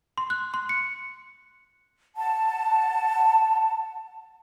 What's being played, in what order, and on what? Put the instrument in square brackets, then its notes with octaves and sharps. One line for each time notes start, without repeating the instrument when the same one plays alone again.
[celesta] C6
F#6
C6
C#7
[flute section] F#5 A5